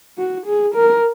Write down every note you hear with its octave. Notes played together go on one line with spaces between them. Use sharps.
F#4
G#4
A#4